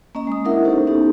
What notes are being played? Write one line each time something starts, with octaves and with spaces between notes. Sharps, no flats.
A#3 C#4 D#5 A#5
G#3 D#6
A#3 D4 E4 A#4 E5 F#5
C#4 D#4 G4 A4 C5
B3 C#4 D#4 G4 A4